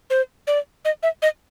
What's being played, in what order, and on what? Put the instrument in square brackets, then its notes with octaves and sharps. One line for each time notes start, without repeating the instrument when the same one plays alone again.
[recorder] C5
D5
D#5
E5
D#5